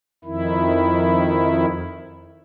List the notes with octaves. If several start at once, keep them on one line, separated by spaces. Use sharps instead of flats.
F2 D#3 E4